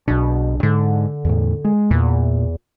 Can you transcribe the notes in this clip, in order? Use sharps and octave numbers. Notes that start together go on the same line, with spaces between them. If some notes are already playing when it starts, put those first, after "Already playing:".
B1 B2 D4
G#2 D3
E2 A2
G#3
E2 A#2